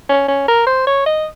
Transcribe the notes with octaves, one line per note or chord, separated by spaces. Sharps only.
C#4
C#4
A#4
C5
C#5
D#5